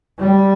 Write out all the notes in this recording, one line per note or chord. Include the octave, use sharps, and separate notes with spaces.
G3